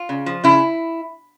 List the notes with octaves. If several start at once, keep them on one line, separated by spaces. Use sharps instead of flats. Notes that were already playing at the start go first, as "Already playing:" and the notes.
Already playing: F4
C#3
F3
C#3 E4